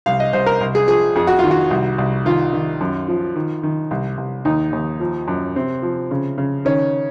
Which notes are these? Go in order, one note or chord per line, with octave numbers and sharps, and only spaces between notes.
C2 F5
D#5
C2 C5
A#4
C2
G#4
F3 G#4
F2 G#4
F#4
D#3 F4
F#4
C2
C2
D#3 F4
D#3
F#2
F3
D#3
D#3
C2
C2
D#2 D#4
D#2
F3
F#2
C3 C4
F3
C#3
C#3
D#3 C#4